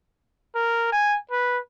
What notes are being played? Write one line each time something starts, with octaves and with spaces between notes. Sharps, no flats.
A#4
G#5
B4